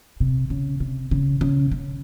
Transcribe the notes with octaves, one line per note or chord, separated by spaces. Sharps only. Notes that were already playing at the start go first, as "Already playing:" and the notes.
C3
C#3
C3
C#3
C#3
C#3